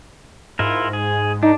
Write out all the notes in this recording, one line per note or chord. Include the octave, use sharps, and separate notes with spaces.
G#2 E4 F4 A#4
G#4
D4 D#4